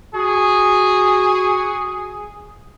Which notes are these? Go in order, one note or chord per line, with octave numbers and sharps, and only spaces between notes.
F#4 G#4